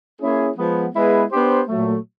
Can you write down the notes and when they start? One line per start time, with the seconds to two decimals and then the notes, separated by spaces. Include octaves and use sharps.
0.20 A#3 C#4 E4 G#4
0.57 F3 G#3 B3
0.94 G#3 B3 E4 G#4 B4
1.31 B3 D4 G4 C5
1.68 A#2 F#3 A3